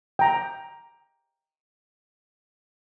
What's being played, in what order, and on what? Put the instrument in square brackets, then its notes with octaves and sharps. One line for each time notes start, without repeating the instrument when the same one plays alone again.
[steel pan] G5 A#5